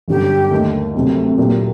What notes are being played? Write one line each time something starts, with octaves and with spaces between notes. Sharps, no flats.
G1 F#2 D3 F#3 G4
D#2 D3 A3 D#4
D2 C3 F#3 C4 G4
A#2 F#3 A#3 D4 G4